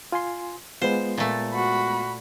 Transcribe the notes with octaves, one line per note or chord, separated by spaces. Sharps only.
F4 G#5 C6
G#3 B3 F4 C5
A#2 A3
F#4 B5